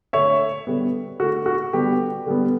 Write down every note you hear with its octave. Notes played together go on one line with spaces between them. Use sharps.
D3 A3 C#5 E5
D3 G3 B3
D3 A3 F#4
F#4
D3 G3 B3 G4
D3 G3 B3